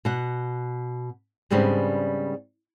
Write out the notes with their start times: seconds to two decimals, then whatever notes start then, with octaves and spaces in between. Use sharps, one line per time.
0.05 B2 F#5
1.50 G#2 C#3 G3 B3 C4 D4